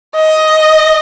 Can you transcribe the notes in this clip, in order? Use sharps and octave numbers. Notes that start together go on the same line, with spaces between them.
D#5